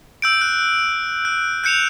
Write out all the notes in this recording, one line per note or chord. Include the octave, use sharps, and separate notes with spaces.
E6 G6 D7
F#6
F#6
F#6 G6 C#7 E7 F7